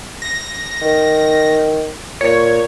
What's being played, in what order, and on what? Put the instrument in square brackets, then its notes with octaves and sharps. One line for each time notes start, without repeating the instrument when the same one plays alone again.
[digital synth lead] A#6
[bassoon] D#3
[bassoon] A#2 [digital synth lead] C#5